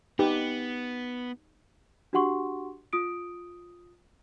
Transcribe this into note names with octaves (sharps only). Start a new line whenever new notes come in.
B3 D#4 G4 B4
D4 F#4 G4 F#5 C6 C#6
F4 D#6 D7